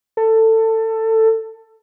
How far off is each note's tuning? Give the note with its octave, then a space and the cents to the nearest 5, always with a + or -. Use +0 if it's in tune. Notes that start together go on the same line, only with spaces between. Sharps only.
A4 +20